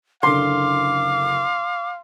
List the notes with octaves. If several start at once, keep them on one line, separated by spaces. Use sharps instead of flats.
F#1 D3 F5 C6 D6